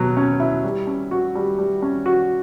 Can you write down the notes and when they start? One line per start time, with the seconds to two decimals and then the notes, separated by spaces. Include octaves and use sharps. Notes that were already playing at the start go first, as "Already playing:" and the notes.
Already playing: B2 F#3
0.17 C#4
0.40 E4
0.64 G3
0.87 C#4
1.11 F#4
1.35 G3
1.59 G3
1.82 C#4
2.06 F#4